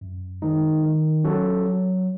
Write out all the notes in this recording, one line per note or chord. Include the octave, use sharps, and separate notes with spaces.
F#2
D#3 G#3 D#4
D#3
F#3 C#4 F#4 A4
F#3